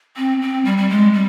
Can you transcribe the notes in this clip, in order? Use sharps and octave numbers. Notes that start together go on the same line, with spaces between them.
C4
C4
G3
G3
G#3
G3